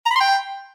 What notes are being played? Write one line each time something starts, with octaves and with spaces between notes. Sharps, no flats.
A#5
B5
C6
G5